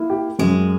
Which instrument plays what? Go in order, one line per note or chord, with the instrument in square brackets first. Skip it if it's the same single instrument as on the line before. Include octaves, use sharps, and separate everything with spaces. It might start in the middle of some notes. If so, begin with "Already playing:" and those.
Already playing: [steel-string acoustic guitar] A#3 [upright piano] E4
[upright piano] G4
[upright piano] F#2 [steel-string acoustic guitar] G#3